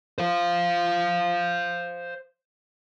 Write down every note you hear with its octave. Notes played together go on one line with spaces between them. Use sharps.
C5 F5